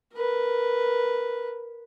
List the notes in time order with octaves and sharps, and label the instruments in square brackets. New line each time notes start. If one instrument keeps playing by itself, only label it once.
[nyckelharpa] A#4 B4